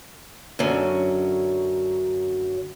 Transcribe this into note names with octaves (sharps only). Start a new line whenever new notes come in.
F#2 D3 F#3 C#4